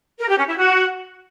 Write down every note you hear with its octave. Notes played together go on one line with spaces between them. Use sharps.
A#4
G4
C#4
E4
F#4